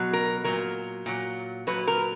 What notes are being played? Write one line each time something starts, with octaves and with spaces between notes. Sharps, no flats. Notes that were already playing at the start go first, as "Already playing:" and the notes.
Already playing: B2 F#3
A#4
A#2 F#3 A#4
A#2 F#3
A#2 F#3 B4
A#4